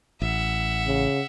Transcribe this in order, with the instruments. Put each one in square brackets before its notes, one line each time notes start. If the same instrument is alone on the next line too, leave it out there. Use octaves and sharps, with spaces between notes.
[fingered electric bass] A1 [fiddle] E5 F#5
[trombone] C#3